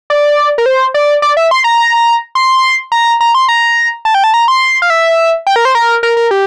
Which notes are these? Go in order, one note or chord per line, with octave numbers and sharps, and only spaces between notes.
D5
A#4
C5
D5
D5
E5
C6
A#5
C6
A#5
A#5
C6
A#5
A5
G5
A5
A#5
C6
F5
E5
G5
A#4
C5
A#4
A#4
A#4
G4